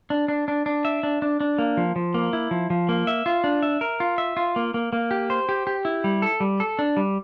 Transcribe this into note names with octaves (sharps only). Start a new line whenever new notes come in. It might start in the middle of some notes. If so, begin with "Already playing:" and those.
D4
D4
D4
D4
E5
D4
D4
D4
A#3
F3
F3
A#3
E4
F3
F3
A#3
E5
F4
D4
E5
A#4
F4
E5
F4
A#3
A#3
A#3
G4
C5
G4
G4
E4
G3
A4
G3
A4
D4
G3